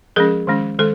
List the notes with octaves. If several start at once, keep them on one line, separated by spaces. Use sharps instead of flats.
F3 G#3 C#4 G#4 A#4
D#3 G#3 C#4
D#3 G#3 A4